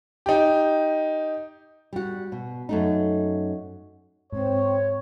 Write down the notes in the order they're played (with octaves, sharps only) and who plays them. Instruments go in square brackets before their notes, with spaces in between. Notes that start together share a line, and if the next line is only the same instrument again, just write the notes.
[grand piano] D#4 G4
[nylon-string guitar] G3 F#4
B2
F#2 A3 D#4
[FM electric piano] G#2 [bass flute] C4 [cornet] C#5